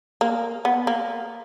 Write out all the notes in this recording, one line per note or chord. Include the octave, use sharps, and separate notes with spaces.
A#3
B3
A#3